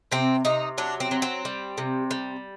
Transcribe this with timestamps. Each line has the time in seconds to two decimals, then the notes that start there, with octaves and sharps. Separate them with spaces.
0.12 C3 C4
0.45 C3 D#4
0.78 F#3 D4
1.00 C4
1.11 F#3
1.22 C4
1.45 G3
1.78 C3
2.11 G3